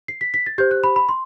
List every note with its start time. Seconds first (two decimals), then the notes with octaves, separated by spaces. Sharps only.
0.08 C7
0.21 B6
0.34 B6
0.46 A6
0.58 G4 C5 G6
0.71 F#6
0.84 B5
0.96 B5
1.09 C6